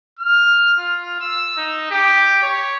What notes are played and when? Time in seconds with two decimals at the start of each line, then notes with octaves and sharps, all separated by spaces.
0.19 F6
0.77 F4
1.20 E6
1.57 D#4
1.91 G4
2.42 C#5